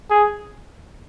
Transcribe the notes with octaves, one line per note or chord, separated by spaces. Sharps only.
G#4